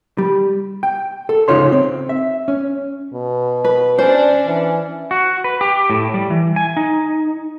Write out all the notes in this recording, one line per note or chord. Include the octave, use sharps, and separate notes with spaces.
G3
G5
A4
C#3 C#4 D#4 F4 C#5 C6
C4
E5
C#4
B2
B4
C#4 D4 C5
E3 C#4
F#4
B4
G4
A2
G3
E3
G#5
D#4